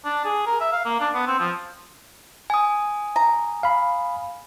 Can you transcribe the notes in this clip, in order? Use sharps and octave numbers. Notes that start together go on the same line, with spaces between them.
D4
G#4
A#4
E5
F5
A#3
D4
B3
C4
F3
G#5 D#6
A#5
F5 B5